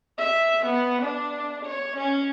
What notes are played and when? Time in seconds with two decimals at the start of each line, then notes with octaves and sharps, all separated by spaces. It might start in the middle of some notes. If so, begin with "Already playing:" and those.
0.18 E5
0.66 B3
1.03 D4
1.65 C#5
1.97 C#4